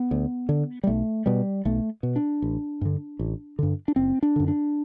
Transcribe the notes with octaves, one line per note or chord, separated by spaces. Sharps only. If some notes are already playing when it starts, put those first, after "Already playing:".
Already playing: B3
D2
D3
G3
B1 A3
B2 G3
B1 A3
B2
D4
A1
G2 D3
A1
G2 D3
D4
F#1 C4
D4
F#2 D3
D4